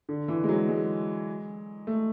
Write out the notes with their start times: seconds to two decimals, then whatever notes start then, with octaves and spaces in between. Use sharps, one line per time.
0.09 D3
0.28 E3
0.44 G#3
0.49 F#3
0.68 G#3
1.87 A3